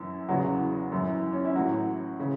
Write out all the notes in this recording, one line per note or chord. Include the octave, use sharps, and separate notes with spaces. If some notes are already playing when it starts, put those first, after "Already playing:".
Already playing: F#2 E3 E4
E2 C#3 E3 F#3 F#4
F#2 E3
C#4
E4
A2 E3 F#3 F#4
C#3 E3